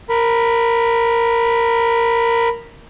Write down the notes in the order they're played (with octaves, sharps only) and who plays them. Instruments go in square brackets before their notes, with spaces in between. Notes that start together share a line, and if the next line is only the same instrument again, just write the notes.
[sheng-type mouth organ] A#4 B5